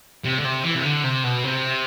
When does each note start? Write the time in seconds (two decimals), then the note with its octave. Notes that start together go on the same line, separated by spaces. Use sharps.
0.25 C3
0.39 D3
0.45 C3
0.64 E3
0.76 C3
0.85 D3
1.04 C3
1.25 B2
1.44 C3